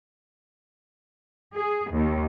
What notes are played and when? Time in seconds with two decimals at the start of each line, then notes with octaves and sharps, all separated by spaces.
1.54 G#4
1.91 D#2